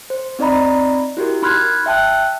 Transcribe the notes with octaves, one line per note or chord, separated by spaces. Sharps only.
C5
C4 D#4 D5 D#5 A#5 B5
E4 F#4 G4 A#4
D#4 B5 C6 F6 F#6 G#6
E5 G5 A5 F#6